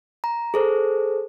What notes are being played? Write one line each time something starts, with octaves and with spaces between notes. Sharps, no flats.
A#5
G#4 A4 C5